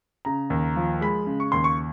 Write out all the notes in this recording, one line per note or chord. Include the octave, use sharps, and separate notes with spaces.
C#3 A#5
D#2
F3
G#3 B5
C#3
C#6
D#2 C6
C#6